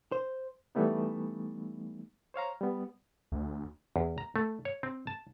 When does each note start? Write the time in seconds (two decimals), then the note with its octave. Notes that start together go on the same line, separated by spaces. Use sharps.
0.12 C5
0.75 E3 G3 A3 B3 D#4
2.34 C5 C#5 F5 A#5
2.61 G3 B3
3.32 D2
3.96 E2
4.18 A#5
4.36 A3
4.65 C#5
4.83 C4
5.07 A5